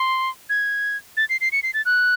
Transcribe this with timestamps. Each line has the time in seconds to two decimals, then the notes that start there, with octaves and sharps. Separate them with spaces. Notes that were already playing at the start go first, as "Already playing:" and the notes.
Already playing: C6
0.49 G#6
1.17 A6
1.29 C7
1.41 C7
1.52 C#7
1.63 C7
1.74 A6
1.85 F#6